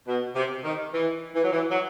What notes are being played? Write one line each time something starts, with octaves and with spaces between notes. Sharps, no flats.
B2
C3
D#3
E3
E3
F#3
E3
F#3